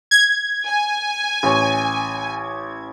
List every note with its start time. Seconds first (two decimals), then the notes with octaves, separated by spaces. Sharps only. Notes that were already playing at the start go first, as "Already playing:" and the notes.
0.11 G#6
0.67 G#5
1.43 A1 C#5